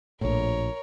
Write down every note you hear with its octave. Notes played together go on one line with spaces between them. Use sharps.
A#1 A2 A#4 C#5